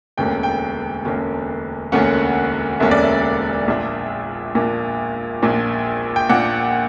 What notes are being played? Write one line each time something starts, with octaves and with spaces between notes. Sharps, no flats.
E1 D2 D3 A#3 C#4 G5
G5
E1 D2 D3 A#3 C#4
E1 D2 D3 A#3 C#4 F#5
E1 D2 D3 A#3 C#4 E5
D5
E5
A#1 A#2 A#3 D4
A#1 A#2 A#3 D4
A#1 A#2 A#3 D4
G5
A#2 A#3 D4 F#5